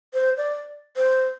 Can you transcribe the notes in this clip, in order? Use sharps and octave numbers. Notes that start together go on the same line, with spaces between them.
C5
D5
C5